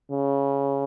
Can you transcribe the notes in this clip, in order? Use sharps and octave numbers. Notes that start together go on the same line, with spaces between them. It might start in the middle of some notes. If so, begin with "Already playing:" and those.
C#3